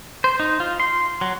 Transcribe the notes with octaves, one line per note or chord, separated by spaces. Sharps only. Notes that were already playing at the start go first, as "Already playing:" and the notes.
C5
D#4
F4
C6
F#3